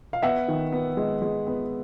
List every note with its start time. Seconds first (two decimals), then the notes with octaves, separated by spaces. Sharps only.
0.13 F5
0.22 B3 E5 F#5
0.48 D#3
0.72 B3
0.97 G#3
1.22 G#3
1.47 B3